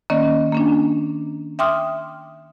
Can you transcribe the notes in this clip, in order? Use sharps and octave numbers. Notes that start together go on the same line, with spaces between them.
D#3 A#3 C#4 D5 D#5
A#3 C#4 D4
E5 G5 C6 D6 D#6 F6